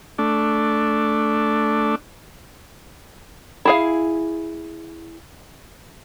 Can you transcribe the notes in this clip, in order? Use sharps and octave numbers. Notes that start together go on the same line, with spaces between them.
A3 D4
E4 G#4 F5